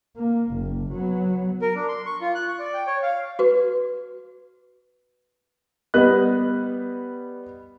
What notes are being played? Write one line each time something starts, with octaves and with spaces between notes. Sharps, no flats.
A#3
F#1
F#3 B3
A#4
D4
C6
C#6
F4
F#6
C#6
D5
G5
C#5
F5
F#4 B4
G3 B3 B4 D#5 F#6